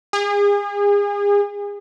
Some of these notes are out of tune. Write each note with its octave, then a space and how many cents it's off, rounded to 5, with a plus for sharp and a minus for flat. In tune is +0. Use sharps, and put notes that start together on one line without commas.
G#4 -35